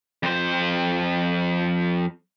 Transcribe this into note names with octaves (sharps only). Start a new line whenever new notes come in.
F2 C5